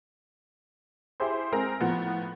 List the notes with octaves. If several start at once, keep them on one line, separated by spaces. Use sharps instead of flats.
E4 G4 G#4 C5 C6
G#3 C4 G#4 A#4 A#6
A2 F3 B3